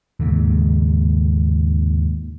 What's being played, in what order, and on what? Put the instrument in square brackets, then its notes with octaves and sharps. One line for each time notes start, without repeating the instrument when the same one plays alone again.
[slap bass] D#2 G#2 C#3 A#3